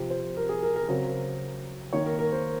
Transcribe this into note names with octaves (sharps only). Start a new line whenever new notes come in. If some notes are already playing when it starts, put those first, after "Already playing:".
Already playing: C3 F3 C4 C5
C5
A#4
G#4
A#4
A#4
C#3 F#3 C4 A#4
D#3 A#3 D#4 C#5
A#4
A#4
C5